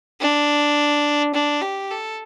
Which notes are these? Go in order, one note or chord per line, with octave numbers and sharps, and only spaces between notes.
D4
D4
G4
A4